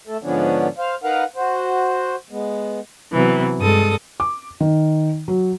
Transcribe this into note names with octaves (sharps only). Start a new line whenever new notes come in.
A3 A4
G#2 D3 F3 B3 C#4 D4
C5 F5
D#4 A#4 B4 F5 F#5
F#4 C5
G#3 B3
C3 E3 F#3 B3
G2 G#3 A4 D#6
D6
D#3
F#3